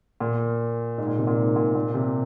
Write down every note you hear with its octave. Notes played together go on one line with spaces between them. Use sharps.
A#2
G#2
A#2
C3
A#2
G#2
A#2
A#2
C3